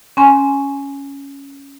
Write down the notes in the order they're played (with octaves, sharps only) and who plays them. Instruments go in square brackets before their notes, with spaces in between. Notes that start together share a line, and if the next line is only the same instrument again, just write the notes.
[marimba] C#4 G#5 C6